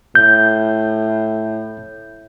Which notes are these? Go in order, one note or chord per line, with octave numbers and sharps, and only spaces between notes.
A2 G6